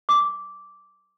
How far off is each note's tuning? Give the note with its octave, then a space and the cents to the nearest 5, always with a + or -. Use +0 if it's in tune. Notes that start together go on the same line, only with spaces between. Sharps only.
D6 -10